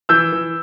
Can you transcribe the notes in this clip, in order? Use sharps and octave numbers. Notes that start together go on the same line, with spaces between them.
E3 E6 G6
E3